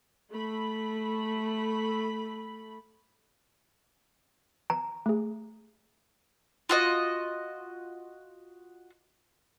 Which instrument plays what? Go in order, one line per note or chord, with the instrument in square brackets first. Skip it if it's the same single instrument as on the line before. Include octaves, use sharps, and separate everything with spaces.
[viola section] A3 B5
[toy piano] A#5
[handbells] A3 G#4
[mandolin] F4 F#4 D#5